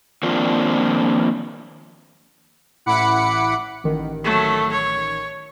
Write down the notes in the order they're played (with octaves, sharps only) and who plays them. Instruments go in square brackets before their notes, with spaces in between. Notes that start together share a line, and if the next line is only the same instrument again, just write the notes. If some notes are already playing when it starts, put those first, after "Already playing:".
[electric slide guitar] D#3 F3 A#3 C4 D4 F4
[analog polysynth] A1 E4 F#5 B5 D6 C#7
[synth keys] A1 D#3
[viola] F#3 A3
C#5